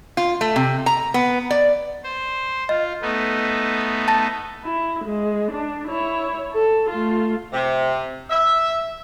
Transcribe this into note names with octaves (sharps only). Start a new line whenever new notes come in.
F4
A3
C3
A#5
B3
D5
C5
F4 D#5
A3 B3 D#4
A5 A6 A#6
E4
G#3
D4
E4 C#5
A4
A3 F4
C3
E5